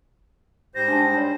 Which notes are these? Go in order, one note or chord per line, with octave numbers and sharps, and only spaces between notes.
G#2 G3 C5 A#6
D4 A5
C#5